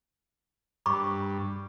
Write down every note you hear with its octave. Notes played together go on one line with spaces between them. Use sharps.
G2 B5 C#6 D6